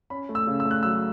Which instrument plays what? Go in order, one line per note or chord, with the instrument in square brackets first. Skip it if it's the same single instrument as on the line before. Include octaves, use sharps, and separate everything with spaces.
[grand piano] C#4 B5
A3
E6
C#3
E6
A3
F#6
F#3 E6